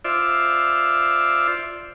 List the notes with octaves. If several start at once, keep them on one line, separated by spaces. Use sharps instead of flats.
F4 C5 D5 E5